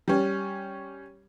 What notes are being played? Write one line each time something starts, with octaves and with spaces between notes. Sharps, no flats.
G3 C#4